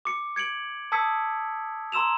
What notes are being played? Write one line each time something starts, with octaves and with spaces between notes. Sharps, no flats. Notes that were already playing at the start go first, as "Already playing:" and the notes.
D6 C#7
G#6 C#7 D7 F#7
A5 D#6 E6 G#6 B6 C#7
A#5 C6 E6 E7 F7